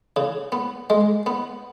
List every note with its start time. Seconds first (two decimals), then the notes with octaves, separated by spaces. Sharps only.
0.16 C#3
0.52 B3
0.90 G#3
1.26 B3